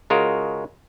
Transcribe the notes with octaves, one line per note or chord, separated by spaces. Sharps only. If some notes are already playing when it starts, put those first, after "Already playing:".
C#3 G#3 F4 F#4 A#4